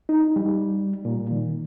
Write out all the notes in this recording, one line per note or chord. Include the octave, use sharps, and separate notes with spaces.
D#4
G3
A#2
D#3